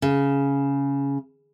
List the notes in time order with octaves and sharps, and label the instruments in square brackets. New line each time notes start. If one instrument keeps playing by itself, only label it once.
[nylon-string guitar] C#3